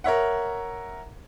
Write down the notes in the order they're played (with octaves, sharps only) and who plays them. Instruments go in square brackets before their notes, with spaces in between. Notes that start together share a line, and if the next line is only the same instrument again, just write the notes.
[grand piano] A#4 C#5 E5 F#5